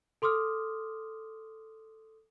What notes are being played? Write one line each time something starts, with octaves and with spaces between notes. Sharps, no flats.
A4 C6 D6 D#6 F6